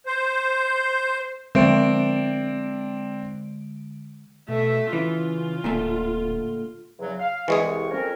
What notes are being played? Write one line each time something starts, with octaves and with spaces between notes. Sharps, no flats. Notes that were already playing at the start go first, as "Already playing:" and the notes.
C5
D3 G#3 C4 D4 D7
B2 A3 E5
C#3 E3 F4
D1 A#2 D3 A3
E2 C#3 F#3
F5
C2 E3 G#3 G#4 C#6
F2 C#4 A#4